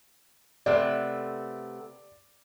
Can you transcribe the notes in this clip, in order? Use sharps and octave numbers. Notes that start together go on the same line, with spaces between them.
C3 A3 B3 D5